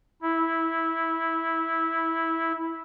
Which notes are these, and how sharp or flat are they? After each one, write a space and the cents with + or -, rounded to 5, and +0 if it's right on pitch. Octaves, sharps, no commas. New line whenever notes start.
E4 -10